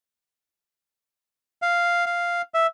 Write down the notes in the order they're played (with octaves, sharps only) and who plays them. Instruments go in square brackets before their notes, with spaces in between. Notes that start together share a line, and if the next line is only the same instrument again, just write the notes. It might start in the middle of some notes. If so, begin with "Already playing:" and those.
[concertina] F5
F5
E5